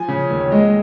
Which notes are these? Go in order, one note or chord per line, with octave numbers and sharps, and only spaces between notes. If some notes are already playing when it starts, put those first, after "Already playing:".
Already playing: F3 G#5
C#3
D#2
C#5
G#3 D#5